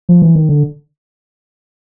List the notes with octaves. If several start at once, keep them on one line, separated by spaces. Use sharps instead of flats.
F3
E3
D#3
D3